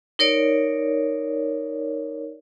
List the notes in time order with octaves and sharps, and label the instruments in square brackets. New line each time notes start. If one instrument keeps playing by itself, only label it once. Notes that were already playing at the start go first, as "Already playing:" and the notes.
[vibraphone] D#4 A#4 C#5 D5